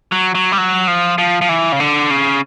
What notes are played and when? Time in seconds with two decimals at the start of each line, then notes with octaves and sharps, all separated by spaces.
0.12 F#3
0.35 F#3
0.52 G3
0.58 F#3
0.88 F3
1.18 F3
1.41 F3
1.49 E3
1.72 C#3
1.80 D3
2.10 C#3